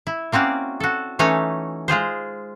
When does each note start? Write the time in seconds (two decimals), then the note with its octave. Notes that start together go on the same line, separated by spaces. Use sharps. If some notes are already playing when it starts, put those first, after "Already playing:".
0.07 E4
0.32 A#3 C4 C#4 F#4 D5
0.80 F#4 A4
1.19 E3 A3 C#4 D#4 C#5 G#5
1.88 G#3 F4 G#4 C5